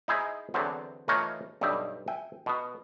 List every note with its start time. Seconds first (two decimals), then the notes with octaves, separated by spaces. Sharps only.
0.08 D#4 E4 G#4 C5 D#5
0.54 E2 D3 F#3 B3 C4
1.08 E3 A3 D#4 F4 A#4 C#5
1.61 B1 G2 G3 D#5 E5 G5
2.08 E5 G5 G#5
2.46 B2 B3